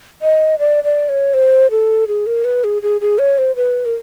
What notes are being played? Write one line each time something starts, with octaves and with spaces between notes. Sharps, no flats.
D#5
D5
D5
C#5
C5
A4
G#4
A#4
B4
G#4
G#4
G#4
C#5
C5
B4
A#4